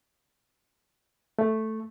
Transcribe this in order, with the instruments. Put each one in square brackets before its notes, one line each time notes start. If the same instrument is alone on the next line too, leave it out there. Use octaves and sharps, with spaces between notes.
[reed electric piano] A3